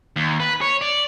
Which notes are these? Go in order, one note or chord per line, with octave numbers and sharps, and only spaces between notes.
D#2
B4
C#5
D5